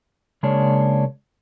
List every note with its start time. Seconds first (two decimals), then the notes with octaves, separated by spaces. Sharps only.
0.43 C#3 G#3 A#3 D4 G#4 C#5